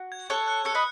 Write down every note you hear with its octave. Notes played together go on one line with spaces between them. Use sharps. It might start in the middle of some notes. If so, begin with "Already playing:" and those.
Already playing: F#4
G#6
A4 C#5 F#6
F#6
A4 C#5 C#7
B4 D#5